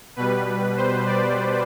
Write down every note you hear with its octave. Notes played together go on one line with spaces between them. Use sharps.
B2 G3 B4
C5
D5